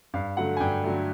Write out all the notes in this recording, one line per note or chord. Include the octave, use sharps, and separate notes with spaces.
G2 F5
D3 F#3 A3 F#5
G#5
G2 G5
D3 F#3 A3